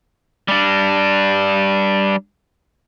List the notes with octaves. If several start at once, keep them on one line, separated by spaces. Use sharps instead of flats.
G3 D4